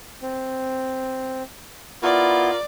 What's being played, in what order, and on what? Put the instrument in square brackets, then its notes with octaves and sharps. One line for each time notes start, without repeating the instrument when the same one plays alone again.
[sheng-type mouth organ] C4
[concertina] B3 E4 [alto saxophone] F4 [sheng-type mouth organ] A#4 [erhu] D5